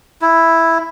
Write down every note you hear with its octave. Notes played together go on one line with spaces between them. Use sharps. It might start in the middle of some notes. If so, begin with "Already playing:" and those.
E4